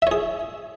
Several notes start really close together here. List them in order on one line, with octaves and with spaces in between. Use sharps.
E5 C#5 G#4